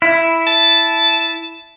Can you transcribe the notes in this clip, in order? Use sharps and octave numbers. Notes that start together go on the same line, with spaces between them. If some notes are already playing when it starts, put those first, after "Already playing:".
E4
A5